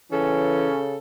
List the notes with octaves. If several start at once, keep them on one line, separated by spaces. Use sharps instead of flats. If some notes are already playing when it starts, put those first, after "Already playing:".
C#3 E3 C#4 A4